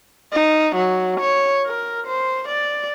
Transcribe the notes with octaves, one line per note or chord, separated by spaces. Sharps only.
D#4
F#3
C#5
A#4
C5
D5